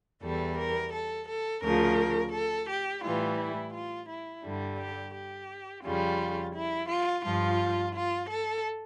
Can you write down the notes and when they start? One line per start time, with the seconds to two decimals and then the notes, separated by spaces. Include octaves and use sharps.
0.22 E2 E3 G3 A4
0.57 A#4
0.93 A4
1.28 A4
1.63 D2 C#3 F3 A#4
2.32 A4
2.69 G4
3.03 A2 E3 G3 F4
3.38 E4
3.73 F4
4.08 E4
4.44 G2 D3 G3
4.78 G4
5.14 G4
5.84 F2 C#3 G3 F4
6.55 E4
6.89 F4
7.25 G2 F3 F4
7.95 F4
8.29 A4